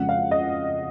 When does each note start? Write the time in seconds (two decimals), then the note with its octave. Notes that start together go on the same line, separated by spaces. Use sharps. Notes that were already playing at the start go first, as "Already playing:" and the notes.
Already playing: F2 C#3 G#3 F#5
0.09 F5
0.31 D#5